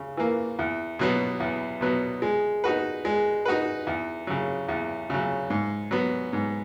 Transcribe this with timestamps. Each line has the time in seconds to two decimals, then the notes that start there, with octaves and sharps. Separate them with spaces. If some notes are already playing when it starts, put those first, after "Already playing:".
Already playing: C#3
0.17 E3 A#3
0.59 E2
0.99 B2 F#3 B3
1.40 E2
1.81 B2 F#3 B3
2.22 G#3
2.64 D#4 F#4 B4
3.05 G#3
3.45 D#4 F#4 B4
3.87 E2
4.27 C#3 F#3
4.69 E2
5.10 C#3 F#3
5.50 G#2
5.91 F#3 B3
6.33 G#2